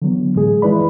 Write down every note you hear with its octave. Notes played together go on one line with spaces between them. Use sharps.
D3 E3 F#3 B3
A2 G#3 G#4
E3 G#3 E4 B4 D5 B5